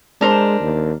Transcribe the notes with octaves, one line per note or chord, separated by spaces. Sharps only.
G#3 D4 A#4 C5
D#2